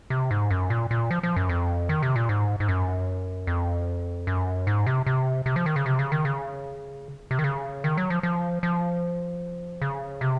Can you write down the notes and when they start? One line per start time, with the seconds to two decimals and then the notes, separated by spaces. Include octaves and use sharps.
0.10 C3
0.31 G#2
0.51 F#2
0.70 A#2
0.91 A#2
1.11 F3
1.23 F3
1.36 F#2
1.49 F2
1.89 D#3
2.02 C3
2.16 A#2
2.29 G#2
2.60 G#2
2.68 F#2
3.47 F2
4.27 F#2
4.67 G#2
4.86 C3
5.06 C3
5.46 C3
5.56 F3
5.66 D#3
5.76 C#3
5.86 C3
5.99 C#3
6.12 D#3
6.25 C#3
7.31 C3
7.39 D#3
7.44 C#3
7.84 D#3
7.97 F#3
8.10 F3
8.23 F3
8.63 F3
9.82 C#3
10.21 C3